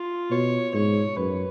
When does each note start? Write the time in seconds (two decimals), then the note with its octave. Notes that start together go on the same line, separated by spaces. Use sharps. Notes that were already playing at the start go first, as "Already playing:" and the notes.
Already playing: F4
0.31 B2 C#5
0.74 G#2 C#5
1.17 F#2 B4